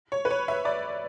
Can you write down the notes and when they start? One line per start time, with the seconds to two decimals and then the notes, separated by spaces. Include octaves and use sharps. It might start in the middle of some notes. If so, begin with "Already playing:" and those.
0.12 C#5
0.25 B4
0.31 C#5
0.48 E5
0.65 D5